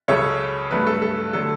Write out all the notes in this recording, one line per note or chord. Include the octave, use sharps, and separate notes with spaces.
C#2 C#3 F#3 A4 C#5
G2 F#3 A3 B4
A4
A4
D3 F#3 A3 A4